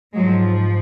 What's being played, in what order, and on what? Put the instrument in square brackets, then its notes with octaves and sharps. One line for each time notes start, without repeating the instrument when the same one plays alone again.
[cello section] G#2 F3 F#3 G#3